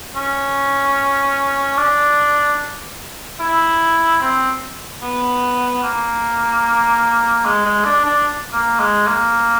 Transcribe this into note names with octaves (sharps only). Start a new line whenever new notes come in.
C#4
D4
E4
C4
B3
A#3
G#3
G#3
D4
D4
A#3
G#3
A#3